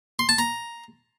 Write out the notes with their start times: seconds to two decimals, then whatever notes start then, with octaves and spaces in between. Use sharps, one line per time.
0.19 C6
0.29 A5
0.38 A#5